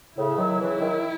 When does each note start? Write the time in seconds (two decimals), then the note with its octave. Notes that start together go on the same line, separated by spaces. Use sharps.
0.16 A2 C#3 E4
0.38 D#3 F#3
0.59 C#3 E3
0.81 D#3 F#3